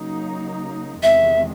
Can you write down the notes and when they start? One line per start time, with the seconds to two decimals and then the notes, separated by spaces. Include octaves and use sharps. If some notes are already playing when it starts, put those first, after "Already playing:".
Already playing: C#3 F#3 A#3 D#4
1.02 E2 C3 D#3 G#3 E5